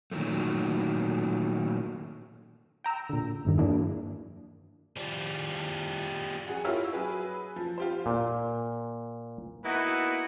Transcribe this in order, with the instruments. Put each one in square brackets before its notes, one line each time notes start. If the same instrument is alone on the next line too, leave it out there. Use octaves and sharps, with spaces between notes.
[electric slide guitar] A#2 D#3 F#3 G#3 A3
[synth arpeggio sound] G5 A#5 E6
A#2 D3
E2 G2 D#3
E3 F#3 A#3 D4 E4 G#4
[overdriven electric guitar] F3 G3
[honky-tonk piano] F#4 G#4
E4 F4 G4 A#4 C#5 E6
F#3 G#4 B4
F3
F4 G4 C5
[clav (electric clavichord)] A#2
[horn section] A#3 B3 D#4 E4 F#4 B4